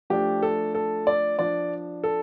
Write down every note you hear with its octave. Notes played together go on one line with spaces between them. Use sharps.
F3 A3 D4 G4
A4
A4
D5
F3 D4 D5
A4